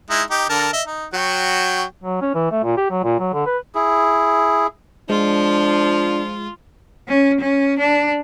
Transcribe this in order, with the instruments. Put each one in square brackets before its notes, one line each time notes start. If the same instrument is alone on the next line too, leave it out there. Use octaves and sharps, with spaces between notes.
[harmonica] G#3 D#4 E4
D#4 G4
D3 A#4 A5
D#5 E5
D#4
F#3 F#4 G5
[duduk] F#3
C#4
E3
A3
A#2
G4
F#3
A#2
F#3
D3
B4
[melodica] E4 G#4
[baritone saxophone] F3 [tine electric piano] G#3 [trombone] D4 [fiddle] F4
[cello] C#4
C#4
D4